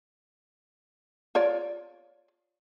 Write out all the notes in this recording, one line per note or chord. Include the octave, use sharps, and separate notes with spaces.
F4 C#5 D5